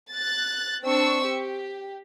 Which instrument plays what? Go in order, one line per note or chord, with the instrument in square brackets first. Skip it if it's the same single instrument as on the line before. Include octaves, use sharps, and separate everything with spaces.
[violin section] F#6 A6
C4 D4 C#6 E6
G4